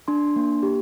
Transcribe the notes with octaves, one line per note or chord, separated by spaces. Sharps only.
D4 C6
A#3
G4